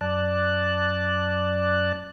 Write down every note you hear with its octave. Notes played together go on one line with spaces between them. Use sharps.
F#2 D5 A5 F#6